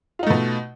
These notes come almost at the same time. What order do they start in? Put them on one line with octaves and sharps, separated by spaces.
F4 D#4 A3 B2